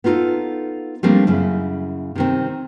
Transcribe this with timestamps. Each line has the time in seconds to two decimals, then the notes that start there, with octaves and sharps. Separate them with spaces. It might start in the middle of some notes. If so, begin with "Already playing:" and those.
0.04 B3 D#4 F4 G4 A4
1.03 F3 G3 A3 A#3 C4 D4
1.27 F#2 C#3 E4
2.15 C3 D#3 C4